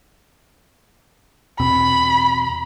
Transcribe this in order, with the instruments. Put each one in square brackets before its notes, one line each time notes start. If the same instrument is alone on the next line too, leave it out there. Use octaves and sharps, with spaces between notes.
[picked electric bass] E2 B2 C4 [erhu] B5